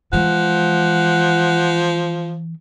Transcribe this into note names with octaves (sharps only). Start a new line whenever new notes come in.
E3 F3 G#3 F#5